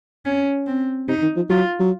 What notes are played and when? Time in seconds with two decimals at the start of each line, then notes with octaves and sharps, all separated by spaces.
0.26 C#4
0.67 C4
1.08 C3 D#4
1.22 D#3
1.36 F3
1.49 F#3 F4
1.79 F#3